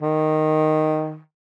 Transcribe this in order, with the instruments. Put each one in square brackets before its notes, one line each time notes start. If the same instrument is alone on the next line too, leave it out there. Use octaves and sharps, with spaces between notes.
[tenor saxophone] D#3